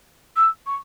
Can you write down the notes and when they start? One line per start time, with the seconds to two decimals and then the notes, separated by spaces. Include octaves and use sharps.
0.36 E6
0.67 C#6